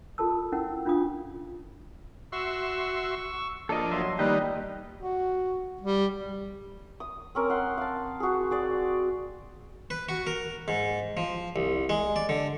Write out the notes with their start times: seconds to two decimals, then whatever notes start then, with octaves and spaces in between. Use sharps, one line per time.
0.18 F4 A4 A#4 A5 E6
0.52 C#4 E4 A#4 F#5
0.85 C#4 D4 F4 F5 D#6
2.32 F#4 E5 C6 C#6 E6
3.69 F3 A#3 D4 A4 D#5
3.92 F#3 D#5 E5 C6
4.19 D#3 G3 A#3 D#4 G4 B4
5.00 F#4
5.81 G3
7.00 D#6
7.35 C4 C#4 A#4
7.50 F#5 C6
7.77 F5 A5
8.20 F#4 G#4
8.51 F#4 G#4 D5
9.90 B4
10.09 F#4
10.27 A#4
10.68 G#2
11.17 F3
11.56 C2
11.89 G#3
12.16 D5
12.29 D3